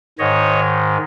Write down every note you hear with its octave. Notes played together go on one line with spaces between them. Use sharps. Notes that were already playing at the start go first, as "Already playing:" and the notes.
G#2 D#3 C#5 D#5